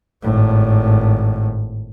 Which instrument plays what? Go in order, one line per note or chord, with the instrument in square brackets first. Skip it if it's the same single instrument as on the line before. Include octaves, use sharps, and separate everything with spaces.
[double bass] G#1 A2